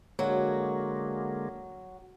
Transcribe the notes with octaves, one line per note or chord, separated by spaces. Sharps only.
D3 F#3 G#3 A#3 F#4